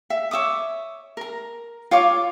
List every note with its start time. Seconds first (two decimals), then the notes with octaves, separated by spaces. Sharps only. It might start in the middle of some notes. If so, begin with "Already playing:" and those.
0.10 E5
0.31 C#5 E5 D6 D#6
1.17 A#4 A#5
1.91 F4 C#5 F5 D6